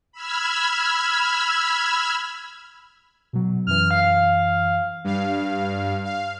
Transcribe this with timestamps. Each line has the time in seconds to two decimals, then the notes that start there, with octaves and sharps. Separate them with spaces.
0.12 B5 E6 F6 G#6
3.33 B2 F#3
3.67 F#2 E3 F6
3.91 F5
5.04 G2 F5
6.05 F5